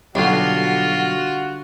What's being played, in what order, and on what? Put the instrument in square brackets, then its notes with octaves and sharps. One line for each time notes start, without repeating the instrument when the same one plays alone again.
[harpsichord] B1 [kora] D3 G3 [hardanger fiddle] F4 [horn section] F#4